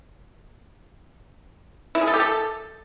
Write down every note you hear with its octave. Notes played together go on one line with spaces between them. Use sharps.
E4
G#4
A4
G4
A4